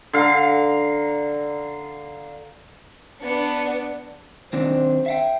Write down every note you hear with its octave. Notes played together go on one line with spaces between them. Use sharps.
D3 F5 A#5
B3 D4 C#7
D#3 C4 D4 C5
E5 F5 G5